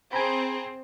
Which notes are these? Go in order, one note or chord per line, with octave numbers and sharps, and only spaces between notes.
C4 G#4 G#5 A#5 B5